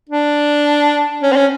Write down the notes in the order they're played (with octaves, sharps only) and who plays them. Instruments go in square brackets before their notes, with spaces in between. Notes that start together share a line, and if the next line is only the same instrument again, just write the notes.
[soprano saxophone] D4
C#4
C4
C#4